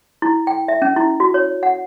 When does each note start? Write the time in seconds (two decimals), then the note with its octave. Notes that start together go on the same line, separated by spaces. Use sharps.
0.22 E4
0.47 G5
0.68 E5
0.82 C#4
0.96 E4
1.20 F#4
1.34 C#5
1.63 F#5